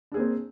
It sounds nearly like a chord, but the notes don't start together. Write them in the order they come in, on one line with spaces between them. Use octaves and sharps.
D4 G#4 A#3 C4